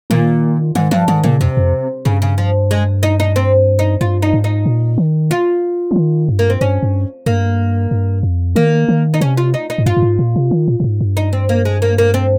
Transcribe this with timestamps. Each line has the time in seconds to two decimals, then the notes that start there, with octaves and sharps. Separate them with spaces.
0.10 A#2 D#3
0.75 G#2 D#3
0.91 G2 F3
1.08 G#2 D#3
1.24 A#2 C#3
1.40 F2 C3
1.57 F2
2.05 G2 C#3
2.22 C#3
2.38 F3
2.71 G#3
3.03 D#4
3.20 D#4
3.36 C4
3.79 D#4
4.01 G2 F4
4.22 D#4
4.33 G#2
4.44 D#4
4.66 A#2
4.98 D#3
5.31 F4
5.91 F3
5.96 D#3
6.29 G2
6.39 A#3
6.50 C4
6.61 G2 C#4
6.83 G2
7.26 G2 A#3
7.91 G2
8.23 F2
8.56 D#3 A#3
8.89 D#3
9.14 D#4
9.21 C3 C#4
9.37 F4
9.54 D#4
9.70 D#4
9.78 G#2
9.86 G2 F4
9.97 G2
10.02 G#2
10.19 A#2
10.36 C3
10.51 D#3
10.68 A#2
10.80 A#2
10.84 G#2
11.01 G2
11.17 D#4
11.33 C4
11.49 A#3
11.65 G#3
11.82 A#3
11.98 A#3
12.14 C4